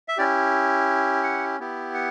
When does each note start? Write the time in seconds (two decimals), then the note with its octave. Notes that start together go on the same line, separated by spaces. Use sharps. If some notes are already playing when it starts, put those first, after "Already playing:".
0.08 E5
0.17 C#4 E4 G4 D5
1.23 F#5
1.59 B3 E4 G4
1.94 F#5